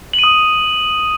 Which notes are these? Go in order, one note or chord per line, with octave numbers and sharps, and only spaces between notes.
F#7
D#7
D#6